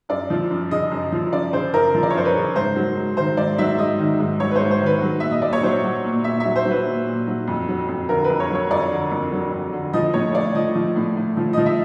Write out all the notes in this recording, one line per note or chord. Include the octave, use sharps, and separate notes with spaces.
F#2 D5
F3
F#2
C#3 D#5
F#2
F3
F#2 D5
C#3 C5
F#2 A#4
F3
D5
C#5
F#2 C5
B4
C#3
G#2 C5
F#3
G#2
D#3 C5
G#2 D5
F#3 E5
G#2 D#5
D#3
G#2
F#3 C#5
B4
G#2 C5
C5
D#3
B4
F#3
A#2 E5
D#5
A#2 D5
C#5
F#3 C5
F#3
A#2
A#2 E5
E5
F#3
C5
F#3
B4
A#2
A#2
F#3
F2
F#3
F2
D3 A#4
B4
F2
C#5
F#3 C#5
F2 D5
D3
F2
F#3
F2
D3
F3 D#5
A2 C#5
A2 D5
F3 D#5
F3
A2
A2
F3
F3 D#5
E5